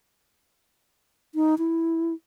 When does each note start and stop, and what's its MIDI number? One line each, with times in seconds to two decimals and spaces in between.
1.35 1.55 63
1.58 2.13 64